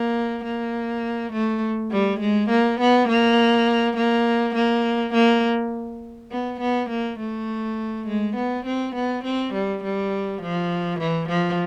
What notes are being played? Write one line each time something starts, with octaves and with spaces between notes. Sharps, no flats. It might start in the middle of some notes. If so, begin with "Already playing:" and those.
Already playing: A#3
A#3
A3
G3
G#3
A#3
B3
A#3
A#3
A#3
A#3
B3
B3
A#3
A3
G#3
B3
C4
B3
C4
G3
G3
F3
E3
F3